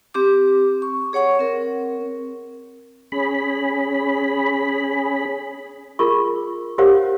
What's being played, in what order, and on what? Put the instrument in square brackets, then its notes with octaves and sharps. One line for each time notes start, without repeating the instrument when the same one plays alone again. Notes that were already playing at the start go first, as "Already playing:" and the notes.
[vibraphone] C4 G4 D6
C#6
G#4 C#5 F#5 C#6
C4 A#4
[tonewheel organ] C#4 G#4 B5
[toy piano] F4 G#4 A#4 C#6
G4 A#4 C5 C#5 F5 F#5